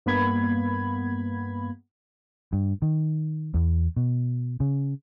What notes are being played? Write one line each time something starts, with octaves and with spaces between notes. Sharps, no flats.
G2 A#3 B3 B5 G#6
G2
D#3
E2
B2
C#3